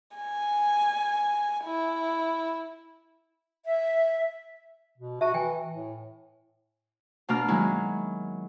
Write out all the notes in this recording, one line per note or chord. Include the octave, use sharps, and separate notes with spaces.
G#5
E4
E5
B2
F#4 E5 A5
E3 G5 G#5
A2
B2 A#3 D4 F5 A#5 F6
D#3 F#3 G#3 A#3 E4